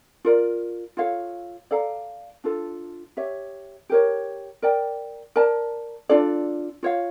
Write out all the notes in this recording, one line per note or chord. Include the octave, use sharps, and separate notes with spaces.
F4 A#4 D5
F4 A4 C#5 F5
A4 D5 F5 A#5
D4 F4 A4
G4 C#5 E5
G4 A#4 C#5
A#4 D5 G5
A#4 D5 A5
D4 F4 A4 D5
F4 C#5 F5